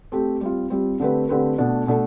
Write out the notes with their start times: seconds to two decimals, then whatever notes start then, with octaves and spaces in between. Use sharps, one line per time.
0.12 A3 C4 G4
0.41 G3 C4 F4
0.70 G3 C4 F4
1.00 D3 A3 C4 G4 B4
1.29 D3 A3 C4 G4 B4
1.58 B2 A3 D4 A4
1.87 B2 A3 D4 A4